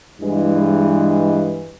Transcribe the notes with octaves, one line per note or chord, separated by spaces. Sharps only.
G2 E3 G#3